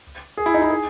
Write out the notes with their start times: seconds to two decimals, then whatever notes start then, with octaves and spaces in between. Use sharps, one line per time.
0.37 G#4
0.46 E4
0.54 D#4
0.62 E4
0.70 G#4